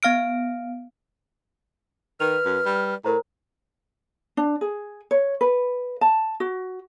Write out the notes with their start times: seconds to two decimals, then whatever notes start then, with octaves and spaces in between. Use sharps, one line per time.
0.03 B3 F5 F6 D7
2.20 D#3 B4 F6 F7
2.45 F#2
2.65 G3
3.05 A2 A#4 C5 A#5
4.37 D4
4.61 G#4
5.11 C#5
5.41 B4
6.01 A5
6.40 F#4